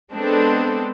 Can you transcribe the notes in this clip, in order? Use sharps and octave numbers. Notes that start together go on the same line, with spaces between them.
G#3 B3 C4 D4 A4